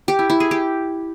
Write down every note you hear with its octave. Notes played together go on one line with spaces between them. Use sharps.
G4
E4
E4
G#4
G4